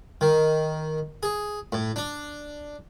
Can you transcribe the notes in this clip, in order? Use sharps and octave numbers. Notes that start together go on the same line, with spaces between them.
D#3
G#4
A2
D4